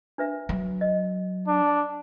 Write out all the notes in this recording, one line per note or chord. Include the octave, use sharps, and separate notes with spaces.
D4 B4 E5
F#3
D#5
D4